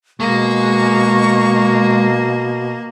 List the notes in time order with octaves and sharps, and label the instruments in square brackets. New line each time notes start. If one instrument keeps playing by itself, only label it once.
[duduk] B2 [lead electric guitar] G#3 [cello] A#3 [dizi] C#6